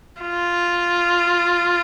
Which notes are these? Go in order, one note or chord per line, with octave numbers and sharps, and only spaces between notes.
F4